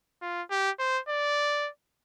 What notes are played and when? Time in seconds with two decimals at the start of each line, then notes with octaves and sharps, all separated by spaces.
0.22 F4
0.51 G4
0.79 C5
1.09 D5